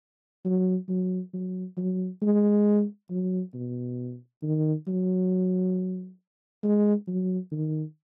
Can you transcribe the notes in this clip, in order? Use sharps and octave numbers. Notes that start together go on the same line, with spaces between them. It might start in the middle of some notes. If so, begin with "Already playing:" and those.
F#3
F#3
F#3
F#3
G#3
F#3
B2
D#3
F#3
G#3
F#3
D#3